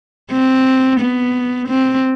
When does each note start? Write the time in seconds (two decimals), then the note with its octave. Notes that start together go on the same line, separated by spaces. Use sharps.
0.32 C4
1.01 B3
1.69 C4